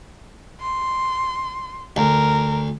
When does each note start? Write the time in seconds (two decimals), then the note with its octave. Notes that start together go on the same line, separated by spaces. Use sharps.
0.60 C6
1.96 D2 A#4